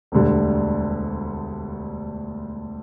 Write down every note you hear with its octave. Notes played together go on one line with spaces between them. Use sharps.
E1 D2 D3 G3